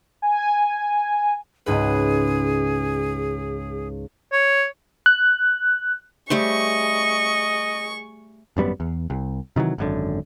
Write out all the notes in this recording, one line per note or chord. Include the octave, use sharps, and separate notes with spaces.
G#5
C#2 G#2 G#4 B4
C#5
F#6
G3 A3 G#4 C5 D#5 C#6
G#1 F#2 G3 B3
E2
C2
C3 D#3 E3 F#3
G#1 F#2 D3